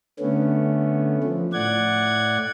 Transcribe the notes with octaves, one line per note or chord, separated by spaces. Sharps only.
D3 A3 B3 C#4
F3
A2 D5 F#5 G#6